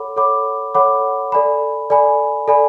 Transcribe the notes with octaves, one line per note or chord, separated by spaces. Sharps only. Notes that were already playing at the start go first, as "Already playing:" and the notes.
Already playing: A4 C#5 F#5 B5 D6
A4 C#5 F#5 B5 D6
A4 C#5 F#5 B5 D6
A4 D5 G#5 B5
A4 D5 G#5 B5
A4 D5 G#5 B5